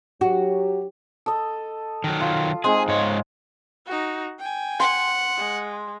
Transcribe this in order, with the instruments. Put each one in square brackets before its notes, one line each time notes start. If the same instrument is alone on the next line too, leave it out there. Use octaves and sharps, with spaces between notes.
[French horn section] F#3 G4 [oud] F#4
[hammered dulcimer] A4 D#5
[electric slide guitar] D#3 F#3
[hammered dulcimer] F4
[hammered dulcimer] G#3 C4 D#4 [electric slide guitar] G#4
[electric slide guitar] G#2 C#5
[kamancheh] D#4 F#4
G5 G#5
[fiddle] F#5 [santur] C6
[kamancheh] G#3